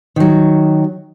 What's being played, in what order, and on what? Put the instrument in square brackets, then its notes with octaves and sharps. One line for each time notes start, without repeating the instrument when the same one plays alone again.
[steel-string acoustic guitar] D#3 F#3